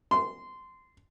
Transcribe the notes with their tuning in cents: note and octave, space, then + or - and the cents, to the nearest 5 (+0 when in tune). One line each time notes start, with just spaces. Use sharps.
C6 -15